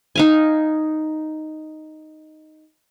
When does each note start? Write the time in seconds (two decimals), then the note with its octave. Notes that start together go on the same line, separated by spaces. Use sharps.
0.16 D#4 F5 G#5